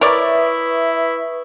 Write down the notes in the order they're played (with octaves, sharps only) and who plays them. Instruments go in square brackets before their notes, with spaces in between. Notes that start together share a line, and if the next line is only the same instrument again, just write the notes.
[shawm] E4 [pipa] A#4 C#5 D5 [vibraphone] B4 C#6 D#6 [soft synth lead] E5